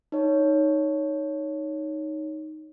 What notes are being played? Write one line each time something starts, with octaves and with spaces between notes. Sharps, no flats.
D#4 C#5